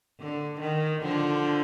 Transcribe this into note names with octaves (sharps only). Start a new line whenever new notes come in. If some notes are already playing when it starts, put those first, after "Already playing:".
D3
D#3
D3 F3